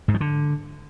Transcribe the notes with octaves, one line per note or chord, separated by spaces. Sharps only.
G#2
F3
D3